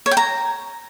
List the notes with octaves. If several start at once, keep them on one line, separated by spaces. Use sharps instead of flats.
C#5
G5
A#5